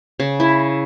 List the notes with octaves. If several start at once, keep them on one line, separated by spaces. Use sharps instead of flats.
C#3
E4